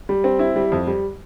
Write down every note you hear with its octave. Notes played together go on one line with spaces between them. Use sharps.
G3
C4
E4
G3
F2
G3